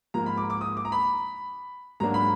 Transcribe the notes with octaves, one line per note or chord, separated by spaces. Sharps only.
G#2 F3 A#3 A#5
B5
D6
D6
D#6
D6
A#5
B5
G#2 F#3 A#3 D4 A#5
B5